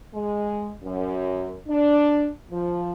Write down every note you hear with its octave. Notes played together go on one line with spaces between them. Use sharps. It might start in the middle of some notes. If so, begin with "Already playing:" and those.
G#3
F#2
D4
F3